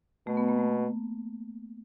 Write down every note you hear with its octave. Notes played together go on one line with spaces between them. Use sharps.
B2 A3
B3
A#3
A3